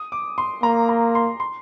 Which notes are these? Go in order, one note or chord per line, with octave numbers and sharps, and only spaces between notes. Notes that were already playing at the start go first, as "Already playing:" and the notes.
Already playing: D#6
D6
C6
A#3 A#5
A#5
C6
C6